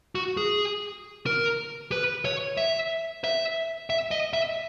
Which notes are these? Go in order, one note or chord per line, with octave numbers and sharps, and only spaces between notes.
F#4
G#4
A#4
B4
C#5
E5
E5
E5
D#5
E5